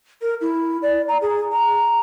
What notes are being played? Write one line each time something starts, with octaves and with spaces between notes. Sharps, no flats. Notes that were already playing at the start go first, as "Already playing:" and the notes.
A#4
E4
D5
A#5
G#4
A#5